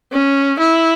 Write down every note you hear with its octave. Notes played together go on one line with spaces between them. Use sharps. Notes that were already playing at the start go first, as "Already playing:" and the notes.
C#4
E4